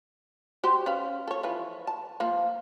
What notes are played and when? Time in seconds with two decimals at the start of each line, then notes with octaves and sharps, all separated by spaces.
0.64 F#4 G4 C5
0.86 C#4 B4 F5
1.27 A4 C#5
1.43 E3 F3 B4
1.87 A5
2.20 F3 A#3